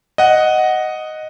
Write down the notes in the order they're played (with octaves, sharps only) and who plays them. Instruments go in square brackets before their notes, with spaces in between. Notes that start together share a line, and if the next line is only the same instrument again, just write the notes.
[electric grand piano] D#5 F#5